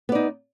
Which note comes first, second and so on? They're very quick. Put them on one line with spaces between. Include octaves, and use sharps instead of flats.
B3 D5 D#4